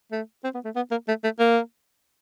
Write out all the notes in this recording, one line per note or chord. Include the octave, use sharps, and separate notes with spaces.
A3
C4
B3
A3
B3
A#3
A3
A3
A#3